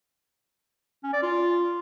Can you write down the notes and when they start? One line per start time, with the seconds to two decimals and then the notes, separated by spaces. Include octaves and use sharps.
1.03 C#4
1.13 D5
1.22 F4